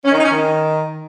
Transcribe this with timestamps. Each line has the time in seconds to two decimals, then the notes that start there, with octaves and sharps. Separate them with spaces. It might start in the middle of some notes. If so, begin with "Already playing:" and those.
0.04 C#4
0.11 D#3
0.18 D#4
0.25 C#4
0.31 D#3